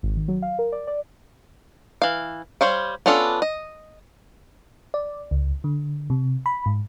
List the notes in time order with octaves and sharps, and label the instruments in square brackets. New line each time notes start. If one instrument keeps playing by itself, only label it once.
[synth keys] G#1
D#3
F#3
F5
A#4
D5
D5
[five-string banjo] E3 F5
G3 C5 C#5 F5
B3 C#4 D4 F4 A4
D#5
[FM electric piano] D5
C#2
D3
C3
B5
G#2